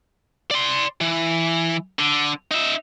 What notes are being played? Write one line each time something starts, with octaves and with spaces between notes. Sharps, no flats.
D5 C6
E3
D3
D#4 E5